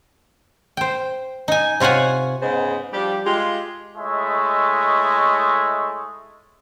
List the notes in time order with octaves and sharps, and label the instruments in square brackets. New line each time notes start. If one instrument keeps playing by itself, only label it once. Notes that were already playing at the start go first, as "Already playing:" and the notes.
[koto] C5 G5
D#4 G#5
C3 F4 C#5 F#5 G#5
[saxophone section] G#2 C#3 G#3 B3 C5 D#5
F3 G3 D4 G4
G#3 F4 G4
[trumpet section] G#3 A3 E4 C#5 D#5 E5